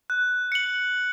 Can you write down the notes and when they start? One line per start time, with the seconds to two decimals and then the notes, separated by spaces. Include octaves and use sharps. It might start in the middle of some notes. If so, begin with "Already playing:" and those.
0.10 F#6
0.52 C#7 F#7